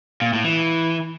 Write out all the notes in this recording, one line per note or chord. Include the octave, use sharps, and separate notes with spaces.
A#2
A2
E3